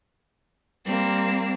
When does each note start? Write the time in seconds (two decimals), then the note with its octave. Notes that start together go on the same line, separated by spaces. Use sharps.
0.85 G3 A#3 C4 E7